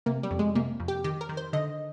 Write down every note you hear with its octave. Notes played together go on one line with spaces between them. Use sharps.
C3 A#3
G3
F2
G#3
C3 A#3
F2
G4
D#3 G4
A#4
D#3
C5
D3 D#5